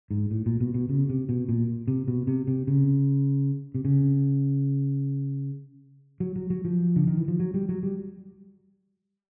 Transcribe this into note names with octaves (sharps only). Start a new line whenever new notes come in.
G#2
A2
A#2
B2
B2
C#3
C3
B2
A#2
C3
B2
C3
C3
C#3
C3
C#3
F#3
F#3
F#3
F3
D3
D#3
E3
F3
F#3
G3
F#3
G3